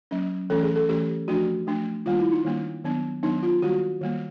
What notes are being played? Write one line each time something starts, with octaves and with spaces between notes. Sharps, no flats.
F#3 A#3 C#4
E3 A3 C#4 A4
G#4
A4
E3 A3 C#4 G4
F3 A3 D4 F#4
F3 A3 D4
D#3 G3 A#3 D4 F4
E4
D#4
D#3 G3 A#3 D4
D#3 F#3 B3 D4
D#3 F#3 B3 D4 D#4
F4
D#3 G3 A#3 F#4
D#3 G3 A#3